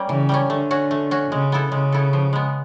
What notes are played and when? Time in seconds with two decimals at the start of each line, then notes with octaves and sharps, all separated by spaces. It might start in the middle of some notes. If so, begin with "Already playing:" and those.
Already playing: G3 A#3 C#4
0.09 C#3 E3
0.29 G3 A#3 C#4
0.50 D3 A3
0.71 C#4 F#4
0.91 A3
1.11 C#4 F#4
1.31 C#3 G#3
1.52 B3 E4 A4
1.72 C#3 G#3
1.92 B3 E4 A4
2.13 F3
2.33 G#3 B3